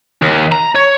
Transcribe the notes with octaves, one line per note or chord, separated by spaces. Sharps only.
D#2
A#5
C#5